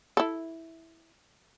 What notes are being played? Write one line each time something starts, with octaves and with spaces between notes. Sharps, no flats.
E4 A4